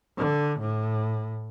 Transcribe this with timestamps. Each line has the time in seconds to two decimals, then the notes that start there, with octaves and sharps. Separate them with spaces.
0.18 D3
0.60 A2